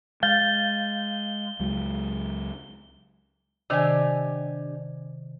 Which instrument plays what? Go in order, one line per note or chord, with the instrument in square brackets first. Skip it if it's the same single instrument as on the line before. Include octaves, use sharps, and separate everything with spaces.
[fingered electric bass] G#3 [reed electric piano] F5 G6 A6 [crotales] G7
[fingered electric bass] C#2 F#3 G#3
[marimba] C3 D#3 [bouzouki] D4 G4 G#5